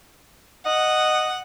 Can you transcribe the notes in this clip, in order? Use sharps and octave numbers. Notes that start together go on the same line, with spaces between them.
D#5 F#5